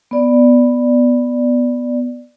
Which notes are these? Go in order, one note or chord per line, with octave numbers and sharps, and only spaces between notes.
B3 D5